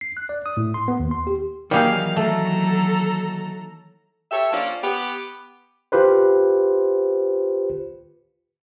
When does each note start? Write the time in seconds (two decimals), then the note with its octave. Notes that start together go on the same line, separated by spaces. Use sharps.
0.01 C7
0.17 F#6
0.29 D5
0.46 D#6
0.57 A2
0.74 C6
0.88 B3
1.00 D#2
1.11 C6
1.27 G4
1.71 D#3 E3 F#3 G3 A#3 G4 G#4 F5
2.17 A3 A4 A#5
4.31 G4 A4 C#5 E5
4.51 F3 A#3 C#4 D4 F4
4.82 B3 G4
5.92 F4 G4 B4 C5